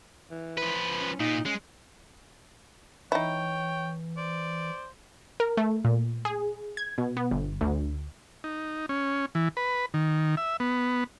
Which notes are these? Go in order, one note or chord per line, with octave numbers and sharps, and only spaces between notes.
E3
F3 B4
C#4
A#2 D#4
G#3 C#4
E3 D#4 E4 C#5 G5
C5 D5
A#4
A3
A#2
G#4
G#6
B2
B3
G1
D2
D#4
C#4
E3
B4
D#3
E5
B3